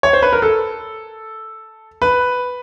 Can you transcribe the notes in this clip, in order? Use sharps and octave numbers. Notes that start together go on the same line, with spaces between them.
C#5
C5
B4
A#4
A4
B4